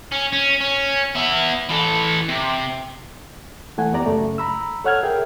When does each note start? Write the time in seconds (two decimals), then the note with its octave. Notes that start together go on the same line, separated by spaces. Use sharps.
0.12 C#4
0.33 C#4
0.61 C#4
1.15 B3 E5
1.69 E3 A4
2.28 C3
3.77 C2 E3 A3 F#5 G#5
3.92 F2 B3 G4 D5 A#5
4.06 F#2 C#3 A3
4.38 A#5 B5 E6
4.84 A4 C#5 F#5 F6 G#6
5.03 G#4 A#4 E5 G5